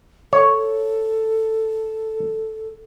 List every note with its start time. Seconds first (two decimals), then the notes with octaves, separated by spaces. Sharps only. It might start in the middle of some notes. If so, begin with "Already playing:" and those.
0.33 A4 C#5